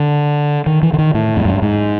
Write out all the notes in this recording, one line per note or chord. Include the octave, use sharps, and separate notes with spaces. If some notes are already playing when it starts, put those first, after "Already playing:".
Already playing: D3
D#3
E3
D3
D#3
A2
F2
F#2
G2
G#2